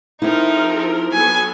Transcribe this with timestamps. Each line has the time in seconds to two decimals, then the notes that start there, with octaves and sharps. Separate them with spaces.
0.22 F3 C4 D#4 E4 A4 A#4
1.12 F#3 B3 A4 G#5